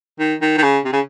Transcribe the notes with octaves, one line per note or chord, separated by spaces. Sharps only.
D#3
D#3
D#3
C#3
C3
C#3